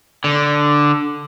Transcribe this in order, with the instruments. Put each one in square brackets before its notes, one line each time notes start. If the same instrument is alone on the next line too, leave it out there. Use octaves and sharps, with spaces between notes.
[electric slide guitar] D3